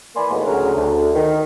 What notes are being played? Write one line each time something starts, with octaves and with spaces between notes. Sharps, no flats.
E3 A#3 D5 G#5 B5 C6
D#2 A2 F#3 G#3 B3
D2 C#3 F#3 G#4 A#4
D2
D#3